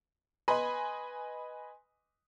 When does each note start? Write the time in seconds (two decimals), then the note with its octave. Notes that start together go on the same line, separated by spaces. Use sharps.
0.48 B4 D#5 G#5 B5 C6